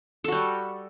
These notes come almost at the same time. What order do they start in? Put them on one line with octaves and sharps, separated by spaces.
A4 F#4 G3